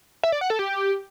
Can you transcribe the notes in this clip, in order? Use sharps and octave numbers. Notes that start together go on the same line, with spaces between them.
E5
D5
F#5
A4
G4